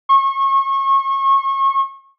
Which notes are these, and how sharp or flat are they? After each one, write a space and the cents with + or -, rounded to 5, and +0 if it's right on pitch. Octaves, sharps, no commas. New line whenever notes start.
C#6 -30